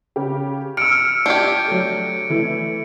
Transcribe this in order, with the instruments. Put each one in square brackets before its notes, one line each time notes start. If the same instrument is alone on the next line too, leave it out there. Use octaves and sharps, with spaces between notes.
[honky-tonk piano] C#3 G4
[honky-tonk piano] E6 F6 [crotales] C#7 D7
[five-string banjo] D4 G4 [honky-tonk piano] G6 G#6
[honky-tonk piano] F#3 A3
E3 A3